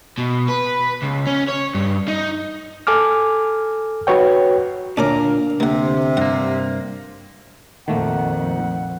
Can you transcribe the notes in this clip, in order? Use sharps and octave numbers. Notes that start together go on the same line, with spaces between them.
B2
B4
C#2
C#4
C#5
G2
D#4
A4 G#5 D6 F6
F#4 B4 C#5 G5
D2 A#2 A#3 C#4 D4 A#4 D6
D2 C3 A#3 F#5
G2 A#3 F#5
A#1 F2 D#3 A3 A#3 F#5